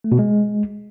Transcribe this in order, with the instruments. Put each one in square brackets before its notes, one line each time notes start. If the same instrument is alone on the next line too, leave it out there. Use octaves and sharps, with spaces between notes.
[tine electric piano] A3
B2
G#3